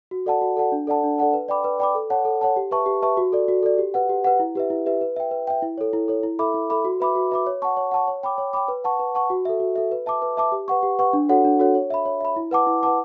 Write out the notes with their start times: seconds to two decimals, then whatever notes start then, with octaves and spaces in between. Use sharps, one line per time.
0.11 F#4
0.26 A4 D5 F#5 A5
0.42 F#4
0.57 A4 D5 F#5 A5
0.72 D4
0.87 A4 D5 F#5 A5
1.03 D4
1.18 A4 D5 F#5 A5
1.33 B4
1.48 D5 G5 B5 D6
1.64 B4
1.79 D5 G5 B5 D6
1.95 A4
2.10 C#5 F#5 A5
2.25 A4
2.41 C#5 F#5 A5
2.56 G4
2.71 B4 E5 A5 C#6
2.86 G4
3.02 B4 E5 A5 C#6
3.17 F#4
3.33 A4 D5
3.48 F#4
3.63 A4 D5
3.78 G4
3.94 B4 F#5
4.09 G4
4.24 B4 F#5
4.40 E4
4.55 G4 B4 E5
4.70 E4
4.86 G4 B4 E5
5.01 B4
5.16 E5 G5
5.31 B4
5.47 E5 G5
5.62 E4
5.78 A4 C#5
5.93 E4
6.08 A4 C#5
6.23 E4
6.39 A4 E5 B5 D6
6.54 E4
6.70 A4 E5 B5 D6
6.85 F#4
7.00 B4 E5 B5 D6
7.15 F#4
7.31 B4 E5 B5 D6
7.47 C#5
7.62 F#5 A5 C#6
7.77 C#5
7.92 F#5 A5 C#6
8.08 C#5
8.23 G5 B5 D6
8.38 C#5
8.53 G5 B5 D6
8.68 B4
8.84 F#5 A5 C#6
9.00 B4
9.15 F#5 A5 C#6
9.30 F#4
9.45 A4 E5
9.60 F#4
9.76 A4 E5
9.92 B4
10.06 E5 A5 D6
10.22 B4
10.37 E5 A5 D6
10.52 G4
10.68 B4 F#5 C#6
10.83 G4
10.99 B4 F#5 C#6
11.13 D4
11.29 F#4 A4 C#5 F#5
11.45 D4
11.59 F#4 A4 C#5 F#5
11.75 C#5
11.90 E5 B5
12.06 C#5
12.21 E5 B5
12.36 E4
12.51 B4 F#5 A5 D6
12.67 E4
12.83 B4 F#5 A5 D6